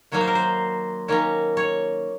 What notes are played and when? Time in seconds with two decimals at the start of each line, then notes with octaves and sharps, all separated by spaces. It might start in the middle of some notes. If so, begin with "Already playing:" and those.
0.12 D#3 F#3 A#3 C#5
0.21 C5
0.27 A#4
0.35 C5
1.08 D#3 A#3 C#4 C#5
1.57 C#5